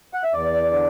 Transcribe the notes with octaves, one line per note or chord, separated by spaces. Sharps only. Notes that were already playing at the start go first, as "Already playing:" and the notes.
F#5
E5
E2 D5
D3